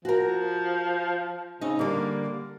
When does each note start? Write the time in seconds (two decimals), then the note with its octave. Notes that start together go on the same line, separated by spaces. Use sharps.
0.05 F3 F#4 A#4
1.61 C#3 C4 D#4
1.79 D3 G3 A#3